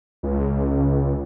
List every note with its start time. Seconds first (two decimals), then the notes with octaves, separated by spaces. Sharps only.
0.23 C#2